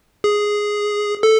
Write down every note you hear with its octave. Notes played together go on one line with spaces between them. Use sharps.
G#4
A4